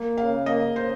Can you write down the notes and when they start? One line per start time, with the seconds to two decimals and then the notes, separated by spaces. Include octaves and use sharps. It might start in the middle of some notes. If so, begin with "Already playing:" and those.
Already playing: A#3
0.17 C#3 F5
0.46 A#3 D#5
0.76 C#3 C5